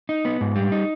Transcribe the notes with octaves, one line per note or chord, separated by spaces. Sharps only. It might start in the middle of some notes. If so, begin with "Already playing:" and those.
D#4
B3
G#2
G3
D#4